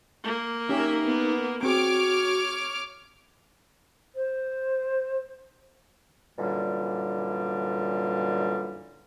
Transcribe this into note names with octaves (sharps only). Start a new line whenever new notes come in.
A#3
C#4 D#4 G4 A#4 E5
B3
C4 F#4 G#4 C#5 D6 F6
C5
F#2 A#2 D3 E3 G3